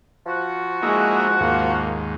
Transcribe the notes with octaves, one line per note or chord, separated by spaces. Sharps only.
F3 F#4
G#3 A#3 D#4 E4
D#2 G#2 A#3